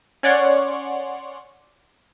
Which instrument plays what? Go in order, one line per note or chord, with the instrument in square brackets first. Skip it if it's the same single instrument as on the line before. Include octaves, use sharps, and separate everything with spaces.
[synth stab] C#4 C#5 D5 F#5 C6 C#6